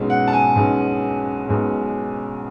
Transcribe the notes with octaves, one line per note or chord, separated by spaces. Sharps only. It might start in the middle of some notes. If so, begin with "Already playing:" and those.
Already playing: B1 B2 G#3 C#4
F#5
A5
G#5
B1 B2 G#3 C#4
B1 B2 G#3 C#4